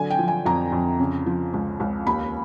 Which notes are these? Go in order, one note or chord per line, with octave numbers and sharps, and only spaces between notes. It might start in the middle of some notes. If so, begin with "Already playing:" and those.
Already playing: D3 F#3 G#5
G5
F3
G#5
F2 A#5
F2
C#3
F3
C#2
C#2
D#2 B5